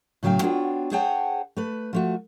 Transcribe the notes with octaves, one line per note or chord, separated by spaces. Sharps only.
A2 C#3 F#3 F5 G5
B3 D4 F4 F#4 C#5 G5
G#4 C5 C#5 F#5 G5 A5
A3 B4
F3 A3 F#4